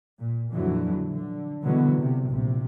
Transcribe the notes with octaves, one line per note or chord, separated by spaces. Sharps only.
A#2
F2 A#2 D3 E3 F#3
D3
B2 D3 E3 F#3 G#3 B3
C3
A#1 C3